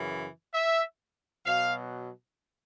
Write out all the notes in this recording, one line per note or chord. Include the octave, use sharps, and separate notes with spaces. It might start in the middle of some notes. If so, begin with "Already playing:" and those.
Already playing: F#2 C#3 E3
E5
B2 F#3 F5